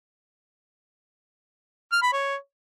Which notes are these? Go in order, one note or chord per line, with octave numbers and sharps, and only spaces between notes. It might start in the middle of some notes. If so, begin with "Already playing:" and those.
F6
B5
C#5